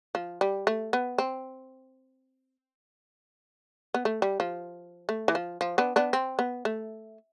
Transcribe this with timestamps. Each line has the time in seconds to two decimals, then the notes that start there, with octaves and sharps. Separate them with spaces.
0.15 F3
0.41 G3
0.67 A3
0.93 B3
1.18 C4
3.94 B3
4.05 A3
4.22 G3
4.40 F3
5.09 A3
5.28 E3
5.35 F3
5.61 F3
5.78 B3 D4
5.96 B3 D4
6.13 C4
6.39 B3
6.65 A3